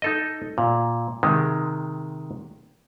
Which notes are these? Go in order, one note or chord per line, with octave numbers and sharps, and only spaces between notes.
D#4 A4 D#5
A#2
C3 D#3 G#3